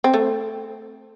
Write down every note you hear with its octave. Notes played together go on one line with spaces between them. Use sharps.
C4
A3